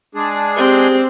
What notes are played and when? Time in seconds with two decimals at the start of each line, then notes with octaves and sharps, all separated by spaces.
0.15 G#3 D4 G#4 A5
0.56 C4 G4